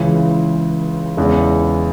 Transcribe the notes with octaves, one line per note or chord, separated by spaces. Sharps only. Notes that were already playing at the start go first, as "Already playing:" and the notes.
Already playing: C#2 C#3 E3
E2 C#3 E3 G#3